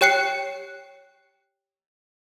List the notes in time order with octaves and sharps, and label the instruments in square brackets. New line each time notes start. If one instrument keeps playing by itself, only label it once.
[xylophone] G4 C#5 G5 F#6 C7 C#7